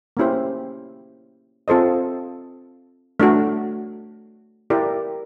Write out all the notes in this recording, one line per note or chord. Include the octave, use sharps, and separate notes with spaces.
A#3 C#4 E4 G4 C5
C4 F4 A4 C5 D#5
A3 D4 F#4
E4 G4 A#4 D5